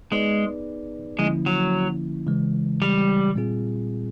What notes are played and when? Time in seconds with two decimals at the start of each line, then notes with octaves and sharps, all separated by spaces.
0.11 G#3 B3 D#4 G#4 B4 D5
1.19 D3 F3 G#3 A#3 C#4 E4
1.46 F#3
2.27 C#3 E3 G#3
2.82 G3
3.35 A#2 G3 C4 F4 G#4